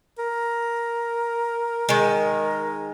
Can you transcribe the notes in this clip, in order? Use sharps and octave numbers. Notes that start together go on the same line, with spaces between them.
A#4
D#3 G#3